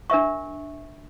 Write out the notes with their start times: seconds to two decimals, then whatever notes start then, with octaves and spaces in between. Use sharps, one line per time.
0.10 D4 A#4 E5 C#6